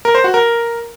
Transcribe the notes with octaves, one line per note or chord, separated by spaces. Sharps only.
A#4
C5
F#4
A#4